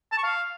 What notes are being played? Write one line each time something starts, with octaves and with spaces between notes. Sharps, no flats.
A5
C#6
F5